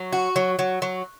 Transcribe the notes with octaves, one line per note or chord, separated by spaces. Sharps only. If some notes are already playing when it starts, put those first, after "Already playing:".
Already playing: F#3
F#4
F#3
F#3
F#3